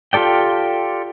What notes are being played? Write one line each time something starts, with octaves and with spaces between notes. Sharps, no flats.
F4 G4 A4 D5 G5